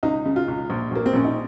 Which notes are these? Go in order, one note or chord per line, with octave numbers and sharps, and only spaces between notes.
C#2 D#4
C#3
F4
C#2
A#1
A#1 A#3
C4
A#1 C#4
D#4